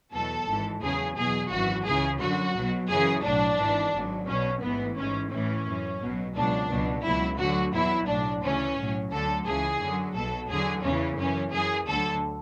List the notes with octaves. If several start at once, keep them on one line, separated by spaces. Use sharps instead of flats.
E2 B2 F#3 A4
G#1 G#2 E3
E2 C#3 F#3 G#4
E2 B2 F#3 G#4
G#1 F#2 E3 F#4
C#2 C#3 E3 G#4
F#2 D3 F#3 F#4
B1 B2 F#3
F#2 C#3 E3 G#4
B1 A2 F#3 D4
G#1 G#2 E3
G#1 G#2 F#3
B1 B2 F#3 C#4
A1 G#2 E3 B3
A1 G#2 E3 C#4
A1 A2 E3 C#4
F#2 E3
B1 B2 F#3
C#2 B2 F#3 D4
C#2 B2 F#3
C#2 B2 F#3 E4
D2 D3 F#3 F#4
E2 B2 F#3 E4
B1 A2 F#3 D4
D2 C#3 E3 C#4
B1 A2 F#3
D2 D3 F#3 A4
C#2 C#3 E3 G#4
F#2 D3 F#3
B1 B2 F#3 A4
E2 D3 F#3 G#4
E2 C#3 E3 C#4
F#2 E3 C#4
F#2 E3 G#4
D2 D3 F#3 A4